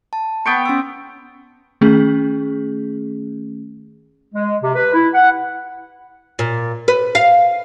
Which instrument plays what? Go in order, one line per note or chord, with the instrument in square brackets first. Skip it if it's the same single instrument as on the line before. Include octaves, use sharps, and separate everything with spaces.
[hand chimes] A5
[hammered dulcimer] B3 G5 C#6
[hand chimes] C#4 C6 E6
[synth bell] D#3 A3 C#4 G#4
[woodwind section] G#3
C3
B4
E4
F#5
[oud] A#2
B4
F5